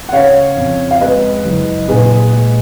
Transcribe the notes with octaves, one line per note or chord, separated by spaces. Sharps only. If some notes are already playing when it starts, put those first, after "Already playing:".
F#5
C#3 C#5 F5
F2
F5
G#3 B4 D#5
F#1
A#2 G#4 B4
G#3